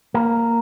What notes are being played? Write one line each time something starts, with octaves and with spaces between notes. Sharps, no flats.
A#3